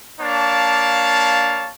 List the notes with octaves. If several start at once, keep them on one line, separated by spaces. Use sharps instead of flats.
A#3 D4 C#5 F5 A5